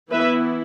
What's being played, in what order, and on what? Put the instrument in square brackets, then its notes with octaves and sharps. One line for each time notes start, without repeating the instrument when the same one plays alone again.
[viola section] E3 B3 E4 B4 E5